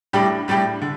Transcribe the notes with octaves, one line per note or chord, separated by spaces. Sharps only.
A2 G3 D4 G4
A2 G3 D4 G4
D3